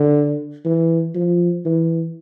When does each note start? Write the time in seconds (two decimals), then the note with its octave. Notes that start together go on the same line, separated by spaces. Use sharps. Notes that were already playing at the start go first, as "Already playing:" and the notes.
Already playing: D3
0.65 E3
1.15 F3
1.65 E3